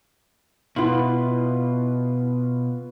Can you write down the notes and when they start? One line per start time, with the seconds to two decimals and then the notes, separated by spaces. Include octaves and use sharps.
0.76 B2 B3 E4 F4 F#7